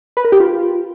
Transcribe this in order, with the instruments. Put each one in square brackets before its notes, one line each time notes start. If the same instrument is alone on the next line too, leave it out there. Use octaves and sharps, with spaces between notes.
[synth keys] B4
A#4
G4
F4